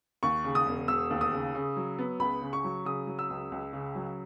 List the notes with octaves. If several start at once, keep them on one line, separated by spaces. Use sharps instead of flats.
D#2 C#6
C#3
D#6
E1
E1 E6
D#2
D#6
C#3
C#3
F#3
B3
C#2 B5
C#3
C#6
F#3
C#3 D#6
F#3
E6
C#2
C#2
C#3
F#3